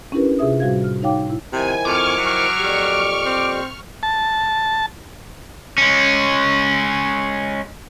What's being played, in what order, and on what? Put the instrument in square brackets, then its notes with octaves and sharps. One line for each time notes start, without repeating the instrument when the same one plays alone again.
[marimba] C#4 D4 E4 G4 A#4 B4
C3 F4 G#4 E5 D#6
A2 G3 F#4 C5 F5 G#6
F6
D#4 C#5 F5 G5 D6
A2 E4
[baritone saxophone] C3 [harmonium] D#3 F3 E4 [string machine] G#5
[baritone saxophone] F2 [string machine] C#6 F6 [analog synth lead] D6
[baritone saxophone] F#3
[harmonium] F2 A#2 G4
[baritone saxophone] C4
[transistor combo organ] A5
[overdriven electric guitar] G#3 C#4